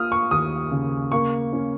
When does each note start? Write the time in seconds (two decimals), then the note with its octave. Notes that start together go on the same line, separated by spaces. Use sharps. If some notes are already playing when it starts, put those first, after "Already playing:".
Already playing: A#3 F4 D#6 F6
0.12 C#6
0.31 D#2 D#6
0.71 C#3
1.12 A#3 C#6
1.53 C#4